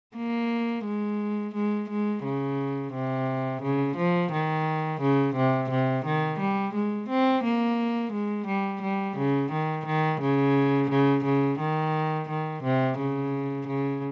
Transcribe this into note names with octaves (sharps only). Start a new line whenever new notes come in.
A#3
G#3
G#3
G#3
C#3
C3
C#3
F3
D#3
C#3
C3
C3
D#3
G3
G#3
C4
A#3
G#3
G3
G3
C#3
D#3
D#3
C#3
C#3
C#3
D#3
D#3
C3
C#3
C#3